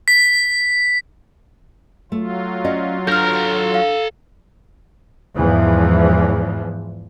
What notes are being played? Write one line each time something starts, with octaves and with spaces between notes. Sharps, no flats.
B6
F#3 A3 F4
C#4 D5 D#5
D4 A4 A#5 F6 G6
F5
E2 G#2 E3 F3